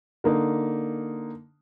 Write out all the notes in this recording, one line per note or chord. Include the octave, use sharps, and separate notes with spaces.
D3 A#3 D#4